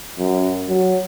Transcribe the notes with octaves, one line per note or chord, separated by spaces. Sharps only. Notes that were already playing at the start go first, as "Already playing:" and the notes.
F#2
F#3